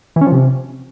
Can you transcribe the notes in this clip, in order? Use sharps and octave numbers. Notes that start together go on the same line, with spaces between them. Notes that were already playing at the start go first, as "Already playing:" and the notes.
E3
C#4
F3
C3